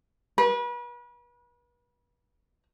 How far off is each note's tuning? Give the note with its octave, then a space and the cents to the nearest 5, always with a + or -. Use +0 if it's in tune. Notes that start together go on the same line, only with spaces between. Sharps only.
B4 -35